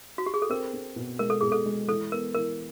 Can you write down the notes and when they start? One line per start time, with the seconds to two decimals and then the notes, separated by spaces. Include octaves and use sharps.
0.18 F#4
0.26 G4
0.34 G#4
0.42 A4
0.49 C4 A#4
0.73 C4
0.96 B2
1.19 G#3 A#4
1.30 A4
1.41 B2 G#4
1.52 A4
1.66 G#3
1.88 E3 A4
2.12 B3 A#4
2.34 E3 A#4